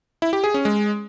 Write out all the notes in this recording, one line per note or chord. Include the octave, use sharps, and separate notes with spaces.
E4
G4
G#4
C#4
G#3